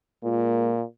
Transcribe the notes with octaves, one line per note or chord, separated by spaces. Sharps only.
A#2 G#3 A#3 F4